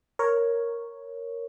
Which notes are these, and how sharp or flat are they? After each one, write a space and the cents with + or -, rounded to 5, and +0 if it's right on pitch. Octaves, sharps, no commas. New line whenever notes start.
A#4 +0 C#5 +0